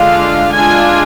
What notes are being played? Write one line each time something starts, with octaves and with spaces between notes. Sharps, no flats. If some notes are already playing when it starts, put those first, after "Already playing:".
Already playing: D3 G#3 D4 F4 F5
G#3 D4 F4 G#5